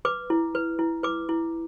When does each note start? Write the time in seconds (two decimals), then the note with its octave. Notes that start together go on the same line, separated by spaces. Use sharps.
0.05 B4 D6
0.30 E4
0.55 B4
0.79 E4
1.03 B4 D6
1.29 E4